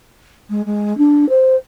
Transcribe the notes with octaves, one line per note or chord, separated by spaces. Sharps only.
G#3
G#3
D4
C5